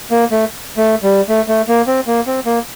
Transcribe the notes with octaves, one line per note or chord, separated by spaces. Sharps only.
A#3
A3
A3
G3
A3
A3
A#3
C4
A#3
C4
A#3